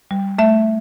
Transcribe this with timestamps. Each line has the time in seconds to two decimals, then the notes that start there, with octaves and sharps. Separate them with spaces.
0.11 G3
0.38 A3 E5